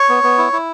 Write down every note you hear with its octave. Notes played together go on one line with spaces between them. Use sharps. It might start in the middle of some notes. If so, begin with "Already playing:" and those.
Already playing: C#5 C#6
B3
B3
E4
E4